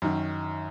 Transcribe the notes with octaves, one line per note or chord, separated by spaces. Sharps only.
F#2 D#3